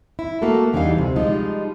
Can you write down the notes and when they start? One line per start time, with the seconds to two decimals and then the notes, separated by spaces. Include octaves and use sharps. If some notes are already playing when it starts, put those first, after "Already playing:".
0.19 E4
0.42 A3 A#3 F#4 A4
0.73 E2 E3 G3 D4 D#4 F5
0.95 D2 C3
1.16 F3 G3 G#3 D#4 F4